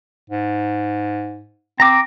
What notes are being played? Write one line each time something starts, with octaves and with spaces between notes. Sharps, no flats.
G#2
C4 A#5 D6